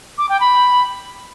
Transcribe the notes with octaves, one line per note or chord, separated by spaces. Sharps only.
D6
G5
B5